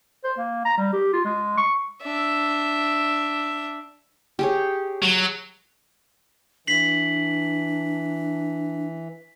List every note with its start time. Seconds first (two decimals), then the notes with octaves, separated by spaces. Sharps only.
0.24 C5
0.38 A#3
0.65 A#5
0.78 G3
0.93 G4
1.13 F4
1.25 G#3
1.57 C#6
2.03 D4 E5
4.39 G4 G#4 C#5
5.02 F#3
6.67 E3 D4 B6 C7 F#7